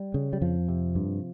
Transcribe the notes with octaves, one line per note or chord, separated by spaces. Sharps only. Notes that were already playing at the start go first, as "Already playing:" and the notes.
Already playing: G3
C#3
G3
F2 F3
C3
G2